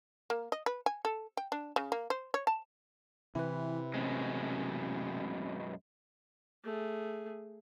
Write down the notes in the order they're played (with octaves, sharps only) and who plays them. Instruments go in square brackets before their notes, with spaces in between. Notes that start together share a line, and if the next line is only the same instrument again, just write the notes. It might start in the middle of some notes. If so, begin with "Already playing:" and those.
[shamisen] A#3
D#5
B4
G#5
A4
G5
D4
C#3
A#3
C5
C#5
A5
[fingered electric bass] C3 [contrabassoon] E3 [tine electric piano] E4 B4
[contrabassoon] A1 [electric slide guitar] F#2 B2 G#3 [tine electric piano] C4
[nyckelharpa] A3 G#4